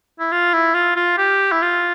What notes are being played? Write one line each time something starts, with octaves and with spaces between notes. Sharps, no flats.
E4
F4
E4
F4
F4
G4
E4
F4